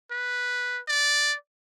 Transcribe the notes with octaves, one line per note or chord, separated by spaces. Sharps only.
B4
D5